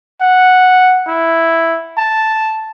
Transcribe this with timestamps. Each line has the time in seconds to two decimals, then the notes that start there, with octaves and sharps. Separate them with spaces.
0.21 F#5
1.07 E4
1.97 A5